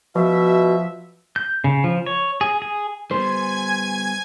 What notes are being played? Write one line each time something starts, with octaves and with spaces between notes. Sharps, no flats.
B2 F3 F#4 E5
G6
C#3
F3
C#5
G#4
G#4
G3 B3 C5 G#5 G#6